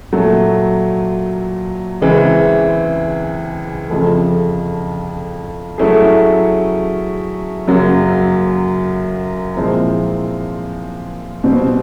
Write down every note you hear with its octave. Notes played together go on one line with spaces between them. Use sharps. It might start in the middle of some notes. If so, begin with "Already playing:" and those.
A#2 F#3 A3
C#2 C#3 E3 G#3 C4
F2 C#3 F3 A3
F#3 A3 C#4 E4 G#4
F#2 C#3 F#3 A#3
A#2 F3 G#3 C4 E4
B2 G3 C4